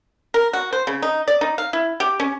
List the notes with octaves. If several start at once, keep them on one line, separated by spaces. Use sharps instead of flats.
A#4
F#4
C5
C#3
D#4
D5
D#4
F5
E4
G4
C#4